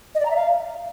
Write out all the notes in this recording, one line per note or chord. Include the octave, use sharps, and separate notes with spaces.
D#5
D5
A#5
E5
F5